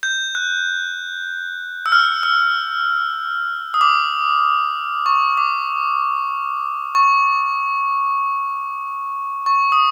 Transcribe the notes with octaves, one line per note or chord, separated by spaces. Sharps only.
G6
F#6
E6
F6
E6
D#6
D6
C#6
D6
C#6
C#6
D#6